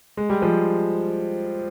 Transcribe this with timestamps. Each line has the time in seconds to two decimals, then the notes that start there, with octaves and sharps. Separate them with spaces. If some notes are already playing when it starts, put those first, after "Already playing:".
0.17 G#3
0.30 G3
0.42 F3 G#3